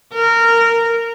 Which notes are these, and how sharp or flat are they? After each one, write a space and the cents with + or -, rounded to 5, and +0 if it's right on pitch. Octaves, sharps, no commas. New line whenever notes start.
A#4 -15